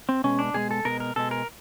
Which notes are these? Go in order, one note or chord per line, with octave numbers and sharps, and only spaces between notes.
C4
B2 G#3 C#4
D4
B2 G#3 G#4
A4
B2 G#3 A#4
A#4
B2 G#3 A4
A#4